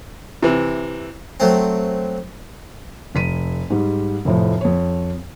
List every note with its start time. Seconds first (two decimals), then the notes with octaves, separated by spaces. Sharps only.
0.43 C3 E3
1.40 F#3 A3 C4
3.15 F1 B6 D#7
3.70 G#2 G3
4.25 F1 A2 F3
4.61 F2 C#5